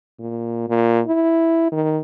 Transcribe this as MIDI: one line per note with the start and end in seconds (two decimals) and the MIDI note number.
0.19 0.67 46
0.68 1.01 46
1.06 1.67 64
1.72 2.00 51